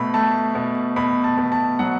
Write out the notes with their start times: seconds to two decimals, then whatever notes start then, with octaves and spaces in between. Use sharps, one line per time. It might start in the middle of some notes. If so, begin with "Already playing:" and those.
Already playing: B2 A3 B5
0.14 A3 A5
0.55 B2
0.96 B2 B5
1.24 A5
1.38 B2
1.52 A5
1.79 F#3 F#5